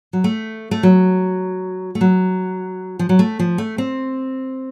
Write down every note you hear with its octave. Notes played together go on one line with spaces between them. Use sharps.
F#3
A3
A3
F#3
A3
F#3
F3
F#3
A3
F3
A3
C4